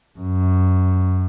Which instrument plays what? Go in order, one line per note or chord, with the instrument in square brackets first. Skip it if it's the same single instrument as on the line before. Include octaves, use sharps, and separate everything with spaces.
[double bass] F#2